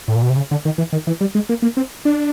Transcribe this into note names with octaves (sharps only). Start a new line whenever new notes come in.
A2
A#2
B2
C3
C#3
D3
D#3
E3
D#3
E3
G3
G#3
A#3
A#3
C4
D4